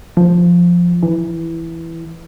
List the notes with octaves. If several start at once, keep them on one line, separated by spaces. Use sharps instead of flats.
F3
E3